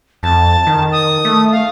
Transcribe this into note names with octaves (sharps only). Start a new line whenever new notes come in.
F2 A5
D#3
D#6
A3
F5